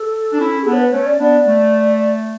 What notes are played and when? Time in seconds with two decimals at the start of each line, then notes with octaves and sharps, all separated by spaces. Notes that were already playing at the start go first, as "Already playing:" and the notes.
Already playing: A4
0.32 D4
0.39 C#4 E4
0.62 G#4
0.66 B3 D4 A4
0.73 C#5
0.79 B4
0.92 A3 C#4 C#5
1.06 D5
1.19 B3 D4 D5
1.46 A3